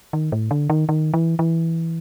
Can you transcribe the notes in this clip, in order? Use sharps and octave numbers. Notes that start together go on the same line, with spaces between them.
D#3
A2
D3
D#3
D#3
E3
E3